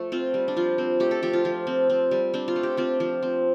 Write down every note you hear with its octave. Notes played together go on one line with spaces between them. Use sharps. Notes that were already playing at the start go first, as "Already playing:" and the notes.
Already playing: F3 A3
C4 F4
G3
D4
F3 F4
C4
A3 G4
A4
F3 G4
F4
F3
C4
C4
G3
C4 D4
F4
A3
G4
C4 F4
F3
C4